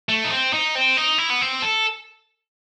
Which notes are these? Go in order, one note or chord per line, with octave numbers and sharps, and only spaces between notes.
A3
D#4
C4
D#4
C4
D#4
E4
B3
C4
A4